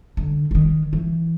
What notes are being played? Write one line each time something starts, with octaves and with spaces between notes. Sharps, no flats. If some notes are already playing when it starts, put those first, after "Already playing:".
D3
D3
D#3
E3